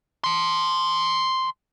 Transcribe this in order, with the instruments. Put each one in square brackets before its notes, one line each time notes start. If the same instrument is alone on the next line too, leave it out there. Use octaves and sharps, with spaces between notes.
[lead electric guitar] A5 C6